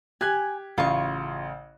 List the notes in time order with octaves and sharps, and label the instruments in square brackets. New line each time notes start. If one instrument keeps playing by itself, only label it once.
[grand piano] G4 F#6 G#6 [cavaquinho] G#5
[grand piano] A1 C#3 [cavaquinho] F4 C#6